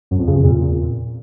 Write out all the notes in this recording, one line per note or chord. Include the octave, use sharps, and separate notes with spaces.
F#2
F2
C#3
E2
A#2